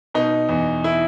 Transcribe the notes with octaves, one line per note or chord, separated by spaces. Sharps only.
B2 D#4
E2
E4